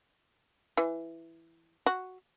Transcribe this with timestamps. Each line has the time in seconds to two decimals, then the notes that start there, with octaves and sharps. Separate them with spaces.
0.77 E3
1.86 F#4